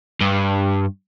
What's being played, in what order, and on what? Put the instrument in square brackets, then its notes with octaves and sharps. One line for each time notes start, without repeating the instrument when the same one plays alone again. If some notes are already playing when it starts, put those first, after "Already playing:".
[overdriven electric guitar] G2